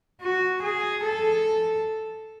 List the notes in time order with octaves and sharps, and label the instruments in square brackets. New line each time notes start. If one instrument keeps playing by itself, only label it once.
[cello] F#4
G#4
A4